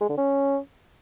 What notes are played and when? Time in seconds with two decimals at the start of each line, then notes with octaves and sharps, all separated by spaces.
0.01 G#3
0.09 D3
0.17 C#4